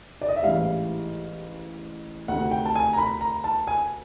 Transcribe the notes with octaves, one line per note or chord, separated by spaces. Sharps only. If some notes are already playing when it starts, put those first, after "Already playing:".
D5
D#5
E5
A1 G#2 E3 G3 F5
D2 C3 D#3 F#5
G5
A5
G#5
A#5
B5
A#5
A5
G#5